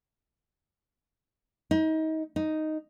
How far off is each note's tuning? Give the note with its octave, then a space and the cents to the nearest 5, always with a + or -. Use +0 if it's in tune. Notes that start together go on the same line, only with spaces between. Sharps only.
D#4 +30
D#4 +0